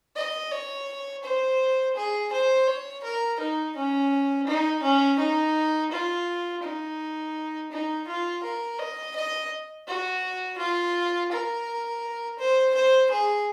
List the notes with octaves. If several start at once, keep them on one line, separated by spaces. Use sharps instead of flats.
D#5
C#5
C5
G#4
C5
C#5
A#4
D#4
C#4
D#4
C#4
D#4
F4
D#4
D#4
F4
A#4
D#5
D#5
F#4
F4
A#4
C5
C5
G#4